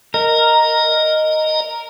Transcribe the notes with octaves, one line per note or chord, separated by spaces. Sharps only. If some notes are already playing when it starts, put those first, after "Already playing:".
A#4 D#5